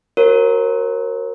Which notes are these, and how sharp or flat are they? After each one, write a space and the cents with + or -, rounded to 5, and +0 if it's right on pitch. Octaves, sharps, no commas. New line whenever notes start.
F#4 +0 A#4 +0 C#5 -45